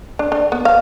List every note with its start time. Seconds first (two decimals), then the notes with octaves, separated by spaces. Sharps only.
0.19 D4
0.32 D4
0.52 B3
0.65 F5